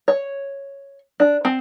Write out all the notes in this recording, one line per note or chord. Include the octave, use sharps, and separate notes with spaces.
C#5
D4
C4